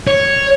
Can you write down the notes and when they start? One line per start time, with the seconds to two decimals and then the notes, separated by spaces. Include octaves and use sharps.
0.07 C#5